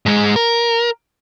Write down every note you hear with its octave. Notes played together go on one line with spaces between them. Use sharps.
G#2 G#3
A#4